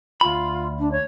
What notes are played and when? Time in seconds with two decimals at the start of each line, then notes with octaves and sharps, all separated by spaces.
0.21 D2 F4 B5
0.79 D4
0.91 C#5